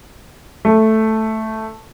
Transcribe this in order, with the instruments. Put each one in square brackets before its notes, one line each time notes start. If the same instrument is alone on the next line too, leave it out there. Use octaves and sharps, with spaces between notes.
[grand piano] A3